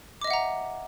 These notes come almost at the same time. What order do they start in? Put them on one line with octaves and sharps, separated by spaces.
D6 D#5 E5 F#5 A#5